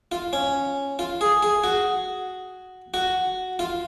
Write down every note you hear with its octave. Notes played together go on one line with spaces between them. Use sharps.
F4
C#4
F4
G#4
G#4
F#4
F#4
F4